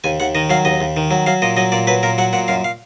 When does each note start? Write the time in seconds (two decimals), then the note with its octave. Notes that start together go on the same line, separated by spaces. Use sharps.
0.04 D#2 G#5
0.20 D#2 F#5
0.35 D#3 D#5
0.50 F#3 F5
0.65 D#2 D#5
0.81 D#2
0.97 D#3
1.11 F#3
1.26 F#3 F5
1.42 A#2 D#5
1.57 F#3 D#5
1.72 A#2 D5
1.87 F#3 B4
2.03 A#2 A#4
2.18 F#3 F#5
2.33 A#2 F#5
2.48 F#2 F5
2.64 F5